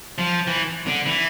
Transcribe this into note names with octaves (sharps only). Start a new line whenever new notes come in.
F3
E3
D3
E3